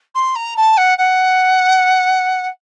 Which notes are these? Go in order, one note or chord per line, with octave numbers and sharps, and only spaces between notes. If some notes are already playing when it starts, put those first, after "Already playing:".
C6
A#5
A5
F#5
F#5